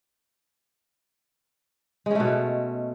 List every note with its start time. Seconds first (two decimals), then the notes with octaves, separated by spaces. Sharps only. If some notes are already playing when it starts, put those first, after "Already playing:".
2.06 G#3
2.11 C#4
2.15 A3
2.20 B2